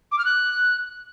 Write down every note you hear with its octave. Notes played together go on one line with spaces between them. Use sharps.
D6
F6
F#6